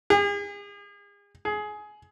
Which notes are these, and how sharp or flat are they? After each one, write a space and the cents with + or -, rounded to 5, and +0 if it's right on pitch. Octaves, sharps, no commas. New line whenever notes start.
G#4 -40
G#4 +20